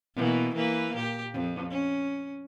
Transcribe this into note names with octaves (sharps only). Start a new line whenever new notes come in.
B2 E3 A#3
E3 A#3 B4
A#2 G4
F2
C#4